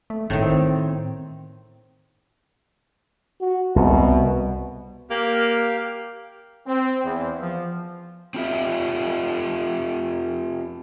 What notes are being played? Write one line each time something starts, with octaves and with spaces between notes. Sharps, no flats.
A3
G#1 A2 D#3
C4
F#4
C2 B2
A#3 G4 F5
C4
E2
F3
C4 F4 G4 E5